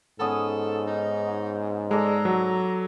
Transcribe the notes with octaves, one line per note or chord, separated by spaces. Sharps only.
G#2 B3 C#4 A4 D#6
D#4
G#3 A4 D5 A#5
F#3